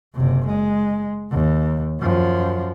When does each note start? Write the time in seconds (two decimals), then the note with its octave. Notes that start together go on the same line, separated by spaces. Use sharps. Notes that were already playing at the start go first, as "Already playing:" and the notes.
0.15 F#1 C3
0.47 G#3
1.31 D#2
2.00 F#2 F3